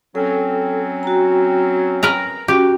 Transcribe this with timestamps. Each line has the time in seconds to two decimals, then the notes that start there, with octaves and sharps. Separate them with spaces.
0.15 F#3 C4 C#4 A4
1.03 F#4 A#5
2.03 A#4 B4 A#5
2.48 C#4 F#4 G4